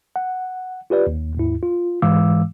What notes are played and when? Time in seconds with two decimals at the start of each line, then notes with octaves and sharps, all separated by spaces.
0.16 F#5
0.90 F4 G4 B4 D5
1.07 D#2
1.35 D#2 G#2 E4
1.63 F4
2.02 G#2 E3 G#3 F5 D6 E6